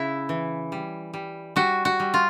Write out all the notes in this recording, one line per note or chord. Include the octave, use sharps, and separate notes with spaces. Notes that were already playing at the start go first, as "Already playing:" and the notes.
Already playing: C#3 E4
E3
G3
G3
G3 F#4
F#4
G3
F4